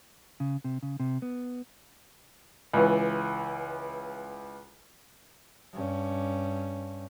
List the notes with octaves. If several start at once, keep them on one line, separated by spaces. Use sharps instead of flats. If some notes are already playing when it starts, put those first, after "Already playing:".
C#3
C3
C#3
C3
B3
C#2 E3
G2 C#4